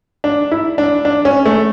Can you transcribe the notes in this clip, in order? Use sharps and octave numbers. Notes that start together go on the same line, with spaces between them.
D4
E4
D4
D4
C#4
A3